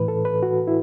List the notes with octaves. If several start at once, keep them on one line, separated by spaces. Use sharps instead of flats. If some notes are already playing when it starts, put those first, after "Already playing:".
Already playing: A2 E3 B4
A4
B4
F#4
E4